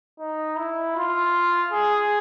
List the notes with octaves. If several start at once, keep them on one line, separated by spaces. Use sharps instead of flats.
D#4
E4
F4
G#4